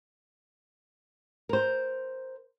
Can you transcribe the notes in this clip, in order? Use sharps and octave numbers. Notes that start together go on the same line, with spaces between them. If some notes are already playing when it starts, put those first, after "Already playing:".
A#4 C5